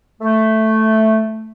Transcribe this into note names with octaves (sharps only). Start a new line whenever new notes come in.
A3